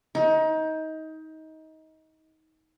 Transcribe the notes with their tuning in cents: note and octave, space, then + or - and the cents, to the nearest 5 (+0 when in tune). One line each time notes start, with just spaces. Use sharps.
D#4 +25